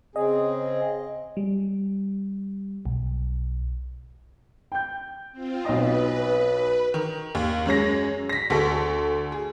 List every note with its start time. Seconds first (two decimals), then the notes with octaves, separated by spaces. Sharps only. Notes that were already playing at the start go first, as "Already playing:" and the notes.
0.16 C#3 C4 G#4 D#5
1.37 G3
2.86 B1
4.72 G5 G6
5.32 C4 F4
5.65 B1 B4 D#5
6.94 D#3
7.35 D#2
7.66 F#2 G#3 C#5 A#6
8.29 A#6 B6
8.50 D2 A4 C#6
9.32 G#4